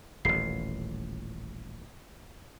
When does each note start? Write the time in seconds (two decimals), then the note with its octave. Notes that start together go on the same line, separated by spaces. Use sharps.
0.25 D#1 A1 C7